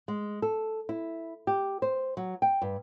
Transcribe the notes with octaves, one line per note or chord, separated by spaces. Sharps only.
G#3
A4
E4
G4
C5
F#3
G5
G2